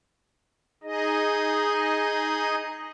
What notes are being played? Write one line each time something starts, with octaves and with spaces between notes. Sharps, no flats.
D#4 G#4 D#5